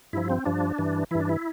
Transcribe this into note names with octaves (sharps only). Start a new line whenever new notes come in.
G2 F3 E4
C4
G2 F3 D4
G2 E3
G2 E3 E4
D4
E4